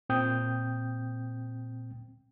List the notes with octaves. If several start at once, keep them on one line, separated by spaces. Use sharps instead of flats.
A#2 C4 G5 D#6 G6